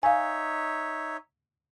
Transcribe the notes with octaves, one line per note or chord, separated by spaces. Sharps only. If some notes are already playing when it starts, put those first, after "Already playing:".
D#4 C#5 E5 F5 G#5